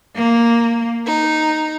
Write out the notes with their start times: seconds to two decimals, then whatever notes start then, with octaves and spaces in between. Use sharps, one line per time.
0.16 A#3
1.06 D#4